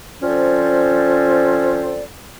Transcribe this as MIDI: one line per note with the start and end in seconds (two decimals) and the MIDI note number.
0.23 2.04 53
0.23 2.04 60
0.23 2.04 61
0.23 2.04 69
0.23 2.04 72
0.23 2.04 74